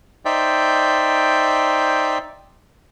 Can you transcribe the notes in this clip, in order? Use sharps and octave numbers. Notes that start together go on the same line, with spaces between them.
D#4 C5 D5 E5 G5